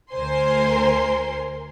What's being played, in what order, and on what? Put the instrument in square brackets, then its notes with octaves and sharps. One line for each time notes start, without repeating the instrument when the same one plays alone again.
[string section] D2 A#4 C5 G#5 C6